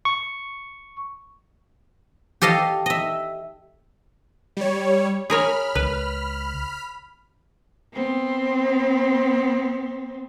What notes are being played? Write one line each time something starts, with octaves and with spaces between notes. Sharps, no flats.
C#6
G4 A4 D#5 F5 A5
D#5 E5
G3 C#5
G#4 A#4 C#5 B5 F6
C#2 B4
B3 C4